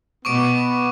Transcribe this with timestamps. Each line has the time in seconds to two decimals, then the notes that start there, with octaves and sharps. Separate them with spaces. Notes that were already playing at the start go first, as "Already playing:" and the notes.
0.25 B2 B3 C#6 D6 D7